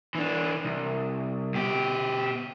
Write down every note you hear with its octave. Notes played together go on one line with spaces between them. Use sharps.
E3 D4
C2
B2 G4